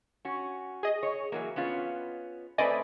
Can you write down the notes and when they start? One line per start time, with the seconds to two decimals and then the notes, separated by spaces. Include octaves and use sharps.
0.25 C#4 F#4
0.83 G#4 D#5
1.03 C#5
1.32 E3 F#3 A#3
1.56 B3 C#4 F4
2.58 A3 C4 B4 D5 D#5 G#5